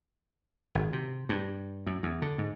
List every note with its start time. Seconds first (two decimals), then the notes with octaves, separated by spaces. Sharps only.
0.75 G#1
0.93 C3
1.29 G2
1.87 F#2
2.03 E2
2.22 D3
2.38 G#2